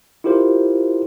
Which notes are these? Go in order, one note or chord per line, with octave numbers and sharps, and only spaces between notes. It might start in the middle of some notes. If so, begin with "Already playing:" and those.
E4 F4 G4 A#4 C5